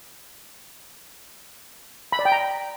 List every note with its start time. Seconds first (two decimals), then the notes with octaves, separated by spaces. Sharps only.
2.12 B5
2.19 D5
2.25 G5
2.32 A#5